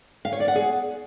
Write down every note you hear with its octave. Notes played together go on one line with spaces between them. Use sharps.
F5
C#5
D5
F#5
G#4